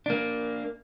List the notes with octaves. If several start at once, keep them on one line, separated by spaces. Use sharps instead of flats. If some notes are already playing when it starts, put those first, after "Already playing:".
A#3 D4